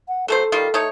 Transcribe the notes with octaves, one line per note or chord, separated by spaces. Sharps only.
F#5
F#3 A3 A4 C5
D#3 G3 F4
A3 D#4 C#5